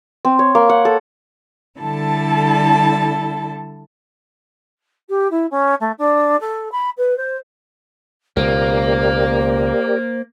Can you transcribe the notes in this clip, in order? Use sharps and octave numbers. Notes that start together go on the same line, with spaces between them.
C4
C#5
A#3
F#5
A4
D3 G3 E4 A4 A5
G4
E4
C#4
A3
D4
A4
B5
B4
C5
C#2 B2 A#3 G4 A#4 C5 D5